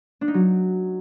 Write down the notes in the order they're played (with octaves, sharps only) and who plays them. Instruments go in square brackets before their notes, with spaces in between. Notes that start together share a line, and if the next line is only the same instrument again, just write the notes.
[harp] D4
D#4
F#3